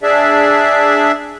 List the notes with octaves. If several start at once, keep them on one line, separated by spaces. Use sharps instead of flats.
D4 G#4 D5 E5